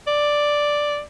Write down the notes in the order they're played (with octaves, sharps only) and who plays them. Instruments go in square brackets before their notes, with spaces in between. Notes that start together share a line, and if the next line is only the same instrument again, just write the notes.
[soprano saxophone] D5